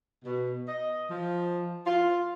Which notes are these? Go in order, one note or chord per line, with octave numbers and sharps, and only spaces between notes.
B2
D#5
F3
F4